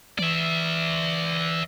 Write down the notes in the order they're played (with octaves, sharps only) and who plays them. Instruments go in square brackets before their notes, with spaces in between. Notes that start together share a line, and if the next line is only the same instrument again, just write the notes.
[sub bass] E3 [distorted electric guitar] D5 E5